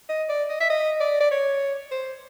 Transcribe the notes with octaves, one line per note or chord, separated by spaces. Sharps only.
D#5
D5
D#5
E5
D#5
D5
D5
C#5
C5